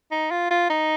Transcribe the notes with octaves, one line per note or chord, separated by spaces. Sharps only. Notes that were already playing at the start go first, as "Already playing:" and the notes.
D#4
F4
F4
D#4